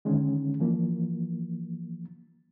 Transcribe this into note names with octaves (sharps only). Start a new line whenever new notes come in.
D3 D#3 G#3 C#4
E3 F3 A#3